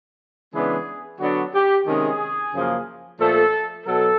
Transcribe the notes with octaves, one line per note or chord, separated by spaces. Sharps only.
C#3 E3 G#3 B3 D4 G#4
D3 F#3 B3 D4 F#4
G4
C3 D#3 G#3 C#4 G#4
F#2 C#3 F3 A#3
A#2 F3 A3 A4
B2 F#3 A4